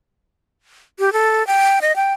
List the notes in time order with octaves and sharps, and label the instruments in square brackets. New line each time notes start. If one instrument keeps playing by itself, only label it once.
[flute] G4
A4
G5
D#5
G5